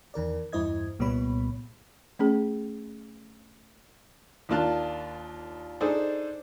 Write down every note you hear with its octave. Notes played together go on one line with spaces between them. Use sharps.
E2 D#3 A#4 D5
E2 G2 E4 C5 D#5 G#6
C2 A#2 G3 B3 C#5 B5
A3 C#4 G#4
D#2 A#3 D4 F4 A5 F#6
D4 D#4 G#4 A4 C5 D5